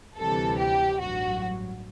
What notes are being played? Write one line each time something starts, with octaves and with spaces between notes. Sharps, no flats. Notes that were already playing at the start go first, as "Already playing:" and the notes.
D2 C3 E3 G3 A4
G4
A1 G2 F#3 F#4